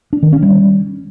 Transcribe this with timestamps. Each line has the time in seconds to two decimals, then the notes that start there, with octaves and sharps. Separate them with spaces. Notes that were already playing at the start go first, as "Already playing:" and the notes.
0.13 D4
0.23 D#3
0.33 C#4
0.42 G3